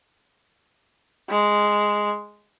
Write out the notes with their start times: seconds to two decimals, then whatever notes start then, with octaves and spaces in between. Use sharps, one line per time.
1.29 G#3